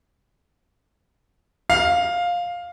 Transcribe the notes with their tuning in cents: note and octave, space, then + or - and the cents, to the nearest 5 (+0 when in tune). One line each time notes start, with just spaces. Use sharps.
F5 +10